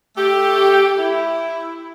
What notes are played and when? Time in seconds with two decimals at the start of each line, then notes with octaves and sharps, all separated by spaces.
0.17 A3 G4
0.98 E4